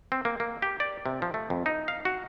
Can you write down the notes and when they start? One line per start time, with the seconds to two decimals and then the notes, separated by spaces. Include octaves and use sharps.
0.12 C4
0.25 A#3
0.40 A#3
0.62 G4
0.80 D5
1.06 C3
1.22 F3
1.34 A3
1.50 F2
1.66 D#4
1.88 F5
2.05 F#4